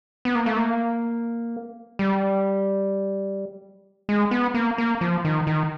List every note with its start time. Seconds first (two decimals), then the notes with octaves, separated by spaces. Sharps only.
0.25 B3
0.35 A#3
0.46 A3
0.57 A#3
1.99 G3
4.09 G#3
4.31 B3
4.54 A#3
4.78 A#3
5.01 F3
5.25 D#3
5.47 D#3